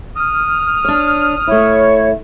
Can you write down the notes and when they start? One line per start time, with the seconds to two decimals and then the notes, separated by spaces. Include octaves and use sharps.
0.17 D#6 F6
0.85 D4 C#5
1.47 A3 E4 C#5